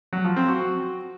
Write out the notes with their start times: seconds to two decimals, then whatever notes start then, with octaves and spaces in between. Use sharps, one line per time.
0.13 F#3
0.24 F3
0.36 C4
0.48 F#4